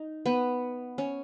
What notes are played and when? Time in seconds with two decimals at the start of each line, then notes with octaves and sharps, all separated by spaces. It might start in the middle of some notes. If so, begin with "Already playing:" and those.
Already playing: D#4
0.26 B3
0.98 C#4